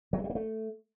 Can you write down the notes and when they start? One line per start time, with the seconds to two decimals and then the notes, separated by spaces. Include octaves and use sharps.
0.13 F#3
0.18 G#3
0.24 G3
0.30 A#3
0.35 A3